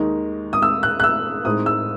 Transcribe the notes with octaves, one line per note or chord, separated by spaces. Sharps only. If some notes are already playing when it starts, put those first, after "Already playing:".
Already playing: D#2 D#3 G#3 D#4
D#6
E6
F#6
F#6
E6
A2 G#3 C4 D#4 D#6
E6